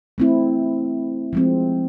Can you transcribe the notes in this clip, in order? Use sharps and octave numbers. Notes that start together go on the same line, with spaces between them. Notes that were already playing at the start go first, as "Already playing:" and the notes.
A3 C4 E4
F3 G#3 C4